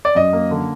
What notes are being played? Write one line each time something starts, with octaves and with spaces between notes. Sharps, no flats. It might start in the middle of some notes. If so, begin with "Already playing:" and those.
D5
F#2 D#5
A#3
D3